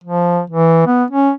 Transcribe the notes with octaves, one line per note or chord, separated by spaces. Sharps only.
F3
E3
B3
C#4